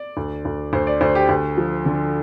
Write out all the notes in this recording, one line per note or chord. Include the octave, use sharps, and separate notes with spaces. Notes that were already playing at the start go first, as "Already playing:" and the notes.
Already playing: D5
D2
D2
D2 C5
D5
D2 C5
G4
D2
F3
D3